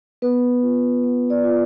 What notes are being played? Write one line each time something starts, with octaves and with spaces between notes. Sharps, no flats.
B3 B4
F4
B3
D5
F4